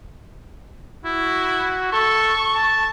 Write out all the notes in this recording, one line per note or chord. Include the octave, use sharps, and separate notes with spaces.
E4 F#4
A4 C#6
A5